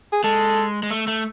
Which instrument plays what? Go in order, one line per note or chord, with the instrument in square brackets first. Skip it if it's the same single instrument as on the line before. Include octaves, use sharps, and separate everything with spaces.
[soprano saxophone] G#4
[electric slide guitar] G#3 [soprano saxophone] A4
[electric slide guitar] G#3
A3
A3